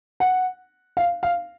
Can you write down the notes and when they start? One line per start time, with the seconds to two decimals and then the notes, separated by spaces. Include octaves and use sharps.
0.20 F#5
0.97 F5
1.23 F5